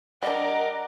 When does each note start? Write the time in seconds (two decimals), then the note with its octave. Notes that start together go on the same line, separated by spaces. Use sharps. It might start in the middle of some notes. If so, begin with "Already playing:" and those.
0.23 G3 D4 A#4 D#5 F#5 D6